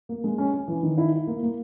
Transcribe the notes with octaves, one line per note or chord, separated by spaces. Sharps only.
A#3
G#3
C#4
C#4
E3
D#3
E4
E4
A#3
A#3